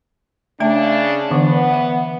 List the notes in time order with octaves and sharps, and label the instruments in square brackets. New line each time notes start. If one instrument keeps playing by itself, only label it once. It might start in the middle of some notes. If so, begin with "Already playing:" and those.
[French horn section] C#3 D4 [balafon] A3 E5 A#5
[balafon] D3 E3 D4 [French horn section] B3
[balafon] E5 F#5